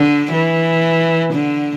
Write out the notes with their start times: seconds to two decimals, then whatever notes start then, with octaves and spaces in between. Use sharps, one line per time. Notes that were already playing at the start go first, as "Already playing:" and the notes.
Already playing: D3
0.32 E3
1.33 D3